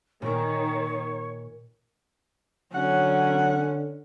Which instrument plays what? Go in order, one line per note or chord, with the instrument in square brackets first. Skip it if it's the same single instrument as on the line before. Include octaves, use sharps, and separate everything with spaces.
[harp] A#2 A#4 [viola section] D#3 [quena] C#5
[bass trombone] D3 [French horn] F#3 [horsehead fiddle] C#4 [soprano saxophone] F#5